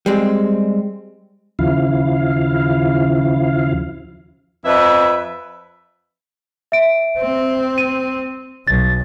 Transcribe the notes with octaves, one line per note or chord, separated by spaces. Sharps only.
G3 G#3 C4
D#2 C#3 F3 E4 F5
F2 B4 E5
E5 D7
C4
D#7
B1 A6